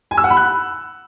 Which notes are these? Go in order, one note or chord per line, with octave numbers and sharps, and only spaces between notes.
G#5
E6
F#5
B5
F#6